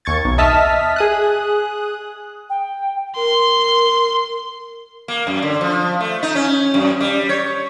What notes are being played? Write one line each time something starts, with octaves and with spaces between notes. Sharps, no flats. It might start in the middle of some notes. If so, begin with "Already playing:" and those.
D#2 C#6 G#6 A6
B1
D#5 E5 A5 D#6 F6 B6
G#4 D#6 F#6
G5
A#4 C6
A#3
F#2
D3
F3
A3
D#4
C#4
F#2
G3
C#5